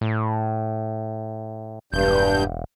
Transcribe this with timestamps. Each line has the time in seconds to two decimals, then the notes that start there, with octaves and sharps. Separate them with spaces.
0.01 A2
1.93 E1 G2 G6